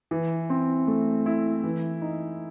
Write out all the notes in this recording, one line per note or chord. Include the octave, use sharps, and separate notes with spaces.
E3
C4
A3
E4
E3
D#4